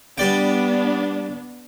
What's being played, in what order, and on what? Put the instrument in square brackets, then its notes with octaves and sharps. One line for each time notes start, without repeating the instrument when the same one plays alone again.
[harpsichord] G3 D5 G5 [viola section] B3 D4